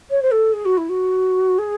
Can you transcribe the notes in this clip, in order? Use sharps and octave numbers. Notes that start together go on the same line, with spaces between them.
C#5
C5
A4
G#4
F#4
E4
F#4
G#4